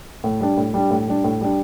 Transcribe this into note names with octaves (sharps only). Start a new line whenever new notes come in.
A2
G3 D4
A2
G3 D4
A2
G3 D4
A2
G3 D4